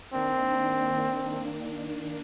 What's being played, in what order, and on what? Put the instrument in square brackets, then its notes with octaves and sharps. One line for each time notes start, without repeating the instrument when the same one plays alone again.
[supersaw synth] D#3 A#3 D4 [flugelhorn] C4